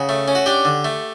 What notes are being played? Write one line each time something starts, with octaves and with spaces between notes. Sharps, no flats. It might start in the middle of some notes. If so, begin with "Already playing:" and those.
Already playing: C#3 F#4
A3
C#4
F#4
D4 G4
D3
A3